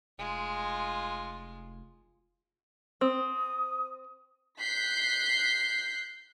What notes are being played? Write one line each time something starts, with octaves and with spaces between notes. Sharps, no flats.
F1 G#3 F4
C4 D#6
F#6 G6 B6 C7